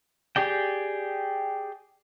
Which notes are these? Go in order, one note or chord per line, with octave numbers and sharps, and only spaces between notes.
G4 G#4 D5 G5